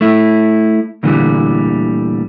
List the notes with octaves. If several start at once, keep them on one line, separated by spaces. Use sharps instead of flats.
A3 E4
D2 A#2 D3 E3 G3